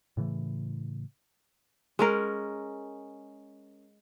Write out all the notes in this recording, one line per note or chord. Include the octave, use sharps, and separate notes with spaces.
A2 C#3 E3 A3
G#3 C#4 A#4